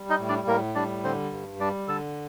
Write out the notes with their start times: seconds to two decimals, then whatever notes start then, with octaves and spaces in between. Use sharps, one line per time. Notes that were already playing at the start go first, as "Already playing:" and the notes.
Already playing: G3
0.09 D#4 D#5
0.19 A2
0.29 D4 D5
0.47 A2 A#3 A#4
0.75 G3 D4 D5
1.04 D3 C4 C5
1.32 G2
1.60 G3 D4 D5
1.88 D3 A4 A5